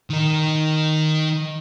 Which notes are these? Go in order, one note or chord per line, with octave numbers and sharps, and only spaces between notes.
D#3 A#4